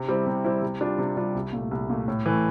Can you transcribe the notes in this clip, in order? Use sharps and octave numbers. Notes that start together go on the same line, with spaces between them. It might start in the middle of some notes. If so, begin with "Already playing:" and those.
Already playing: C3
G3 C4 E4
C3
G3 C4 E4
C3
G3 D4 F4
C3
G3 D4 F4
C2
A#2 A3
C2
A#2 A3
A2
E3 A3